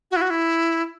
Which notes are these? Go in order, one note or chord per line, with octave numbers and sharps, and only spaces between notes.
F#4
E4
F#4
E4